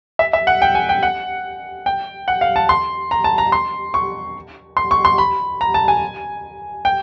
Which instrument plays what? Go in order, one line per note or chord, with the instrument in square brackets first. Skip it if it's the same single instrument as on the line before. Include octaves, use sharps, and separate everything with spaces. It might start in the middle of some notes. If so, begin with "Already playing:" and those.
[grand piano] E5
E5
F#5
G5
G#5
G5
F#5
G5
F#5
F5
A5
C6
A#5
A5
A#5
C6
C#6
C6
C#6
C6
B5
A#5
A5
G#5
G5